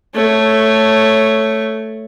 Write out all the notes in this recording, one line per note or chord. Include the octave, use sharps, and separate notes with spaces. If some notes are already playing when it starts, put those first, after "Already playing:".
A3 C#5